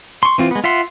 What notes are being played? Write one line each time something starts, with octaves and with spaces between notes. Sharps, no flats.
C6 C#6
E3 C4 F4
G#3 B3
F4 E5 F#5 C6